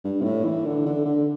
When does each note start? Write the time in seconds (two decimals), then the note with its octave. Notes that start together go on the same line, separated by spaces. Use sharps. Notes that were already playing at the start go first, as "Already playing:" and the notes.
0.04 G2
0.21 C3
0.24 A2
0.45 E3
0.66 D3
0.86 D3
1.06 D3